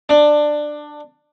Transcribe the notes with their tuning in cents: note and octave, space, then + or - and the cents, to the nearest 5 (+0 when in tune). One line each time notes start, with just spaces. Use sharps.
D4 +15